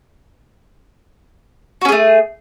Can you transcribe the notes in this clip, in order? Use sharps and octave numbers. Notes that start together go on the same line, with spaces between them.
A3 C#4 F#4 G#4